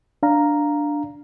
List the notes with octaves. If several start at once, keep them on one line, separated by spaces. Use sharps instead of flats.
D4 F5 A#5